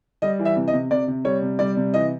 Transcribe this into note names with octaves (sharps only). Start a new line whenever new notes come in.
G3 D#5
E3
E5
C3
D#5
C3
C3 D5
C3
G3 C#5
C3
G3 D5
C3
E3 D#5